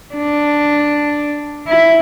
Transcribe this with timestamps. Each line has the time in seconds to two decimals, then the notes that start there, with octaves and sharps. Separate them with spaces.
0.14 D4
1.68 E4